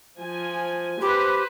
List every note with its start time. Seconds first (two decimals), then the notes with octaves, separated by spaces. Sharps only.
0.19 F3 G#5
1.01 G4 B4 C5